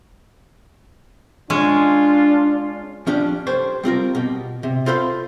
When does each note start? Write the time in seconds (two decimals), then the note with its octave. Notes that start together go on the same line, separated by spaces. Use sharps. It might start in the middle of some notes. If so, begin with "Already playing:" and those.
1.50 G#3 C#4 D4 F4
3.07 F3 C#4 D4 G4
3.47 G4 A4 C5 C#5
3.83 G3 C4 F4 A#4
4.15 B2 G4
4.63 C3
4.86 F4 A4 C5 F5 B5 C6